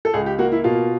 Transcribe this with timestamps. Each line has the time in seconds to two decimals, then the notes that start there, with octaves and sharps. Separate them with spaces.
0.05 A4
0.14 C#2 G#4
0.26 G4
0.38 A#3 F#4
0.52 E4
0.64 B2 F4